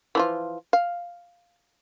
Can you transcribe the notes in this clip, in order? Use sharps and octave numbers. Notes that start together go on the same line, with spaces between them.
E3 F3 F4
F5